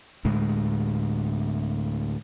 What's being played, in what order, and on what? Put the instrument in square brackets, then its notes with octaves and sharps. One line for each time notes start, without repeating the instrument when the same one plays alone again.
[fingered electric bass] D2 A2 G#3